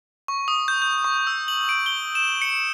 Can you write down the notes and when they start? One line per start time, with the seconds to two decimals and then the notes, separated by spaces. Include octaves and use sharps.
0.28 C#6
0.48 D#6
0.68 G6
0.82 G6
1.04 C#6
1.27 E6
1.48 F#7
1.69 D7
1.86 G7
2.15 E7
2.42 C#7